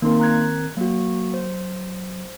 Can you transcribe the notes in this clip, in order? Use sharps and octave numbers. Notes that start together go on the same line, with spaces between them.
D#3 A#3 C4 D#4 A#4 C6
A#5 F#6 G#6
F#3 A#3 F#4
C5